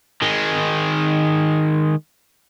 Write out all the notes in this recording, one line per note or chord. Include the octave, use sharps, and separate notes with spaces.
D#3 G#3